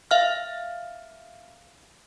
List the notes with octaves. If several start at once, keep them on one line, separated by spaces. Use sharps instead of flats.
E5 F5 F6